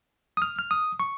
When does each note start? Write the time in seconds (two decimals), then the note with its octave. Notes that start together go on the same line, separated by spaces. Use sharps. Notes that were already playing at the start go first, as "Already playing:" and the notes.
0.37 D#6
0.42 F6
0.59 F6
0.71 D#6
1.00 C#6